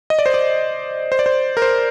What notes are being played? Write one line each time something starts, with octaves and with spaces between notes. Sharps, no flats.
D#5
D5
C5
D5
C5
D5
C5
A#4
C5